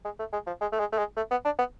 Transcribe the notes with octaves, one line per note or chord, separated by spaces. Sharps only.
G#3
A3
G#3
F3
G#3
A3
G#3
A3
G#3
A3
B3
D4
B3